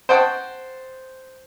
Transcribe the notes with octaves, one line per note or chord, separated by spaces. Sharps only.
C5 D#5 F#5 G5 A5 C#6